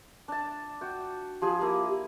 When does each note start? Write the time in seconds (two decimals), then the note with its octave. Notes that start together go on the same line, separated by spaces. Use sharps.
0.28 D4 A5
0.81 F#4 G5
1.42 F3 G4 G#4 G#5
1.61 A#3 E4